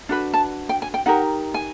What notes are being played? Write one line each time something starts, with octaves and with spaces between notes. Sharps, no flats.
D4 F#4 B4
A5
G5
G#5
G5
D#4 G4 A#4 F#5
G#5